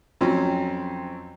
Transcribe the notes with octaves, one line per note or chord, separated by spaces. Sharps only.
F2 F#3 C4 C#4